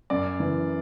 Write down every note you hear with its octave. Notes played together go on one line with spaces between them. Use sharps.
F#2 D5
E3